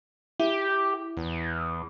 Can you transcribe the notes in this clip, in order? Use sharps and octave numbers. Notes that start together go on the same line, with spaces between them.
E4 G4
E2